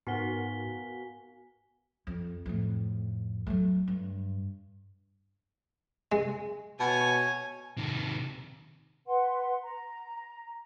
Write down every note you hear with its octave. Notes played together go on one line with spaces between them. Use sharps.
G#2 B3 F#4 A#4 G#5 B6 G7
F2
F2 A2
F#3 A3
G2
G#3
B2 C#5 G#5
C3 D#3
B4 F#5 C6
A#5